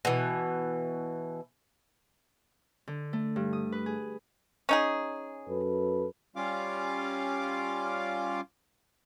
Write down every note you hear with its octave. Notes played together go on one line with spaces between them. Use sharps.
B2 E3
D3
A3
G2
D#6
B4
G#4
C#4 D#4 G#4
F#2 A4 B4
G3 C#4 F4 F5 D6